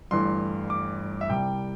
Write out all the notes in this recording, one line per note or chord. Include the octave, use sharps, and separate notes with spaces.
G1 G2 E3 A3 C6
D6
E5
C2 C3 G3 G5